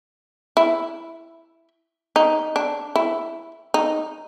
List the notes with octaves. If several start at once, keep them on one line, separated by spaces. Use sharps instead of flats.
E4
D#4
D4
E4
D#4